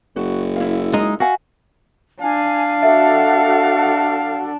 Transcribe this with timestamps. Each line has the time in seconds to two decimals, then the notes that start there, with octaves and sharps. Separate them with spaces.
0.16 F#1 F#4
0.56 E4 F5
0.94 G#3 D#4
1.20 F#4 E5 F5 G#5
2.21 D4 F5 G#5
2.83 F#4 A4 E5 F#5